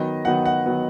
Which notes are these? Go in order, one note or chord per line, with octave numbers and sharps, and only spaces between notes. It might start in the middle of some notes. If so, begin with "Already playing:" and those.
Already playing: D#3 F#3 B3 D#5
D#3 F#3 B3 F#5
F#5
D#3 F#3 B3